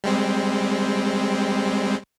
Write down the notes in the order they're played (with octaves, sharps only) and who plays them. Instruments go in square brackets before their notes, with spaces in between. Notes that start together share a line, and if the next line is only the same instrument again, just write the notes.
[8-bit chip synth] G3 G#3 C4